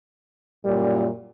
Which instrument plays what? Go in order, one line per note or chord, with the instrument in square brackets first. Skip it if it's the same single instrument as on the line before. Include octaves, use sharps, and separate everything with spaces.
[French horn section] F#2 A#2 [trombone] G3